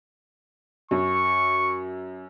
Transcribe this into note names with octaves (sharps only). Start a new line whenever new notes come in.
F#2 C#6